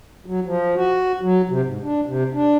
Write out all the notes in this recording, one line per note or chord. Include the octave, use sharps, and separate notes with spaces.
F#3
F3
F#4
F#3
C3
G#2
D4
C3
D4